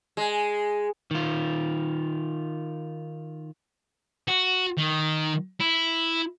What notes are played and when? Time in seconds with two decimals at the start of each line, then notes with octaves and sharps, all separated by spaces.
0.17 G#3
1.11 D#3 F4
4.28 F#4
4.78 D#3
5.60 E4